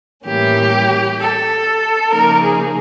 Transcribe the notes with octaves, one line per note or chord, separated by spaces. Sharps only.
A2 E3 G3 A#3 C#4 G4
A4
C#3 F3 A#3 D#4 A#4
G#4